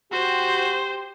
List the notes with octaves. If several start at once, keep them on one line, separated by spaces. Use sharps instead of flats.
F#4 G4 C5